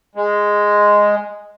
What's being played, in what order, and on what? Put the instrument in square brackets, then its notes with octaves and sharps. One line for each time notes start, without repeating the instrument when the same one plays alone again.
[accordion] G#3